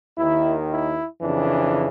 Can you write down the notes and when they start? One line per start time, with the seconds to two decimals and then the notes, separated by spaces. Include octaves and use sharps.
0.17 D#2 D#3 E4
0.69 E4
1.21 F2 C#3 E3 D4